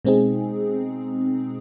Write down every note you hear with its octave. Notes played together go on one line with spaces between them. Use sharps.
B2 G#3 C4 D#4 G#4